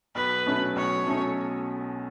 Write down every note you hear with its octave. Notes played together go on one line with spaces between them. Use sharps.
B1 B4
B2 F#3 A3 C#4
B1 C#5
B2 F#3 A3 C#4